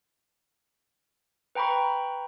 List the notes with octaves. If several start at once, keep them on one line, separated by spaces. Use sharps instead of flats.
B4 G5 A#5 B5 C#6